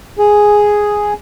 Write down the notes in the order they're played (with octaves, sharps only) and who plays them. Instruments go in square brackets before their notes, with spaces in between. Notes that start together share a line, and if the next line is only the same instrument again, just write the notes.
[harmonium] G#4